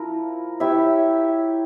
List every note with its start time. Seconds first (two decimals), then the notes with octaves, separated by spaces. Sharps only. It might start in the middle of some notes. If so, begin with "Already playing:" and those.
Already playing: F3 E4 A#4
0.60 E4 G4 C#5 E5